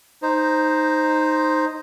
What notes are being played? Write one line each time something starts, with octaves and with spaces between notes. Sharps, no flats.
D#4 C5